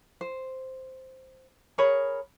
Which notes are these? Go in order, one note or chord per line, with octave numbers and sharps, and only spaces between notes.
C5
G#4 A#4 C#5 B5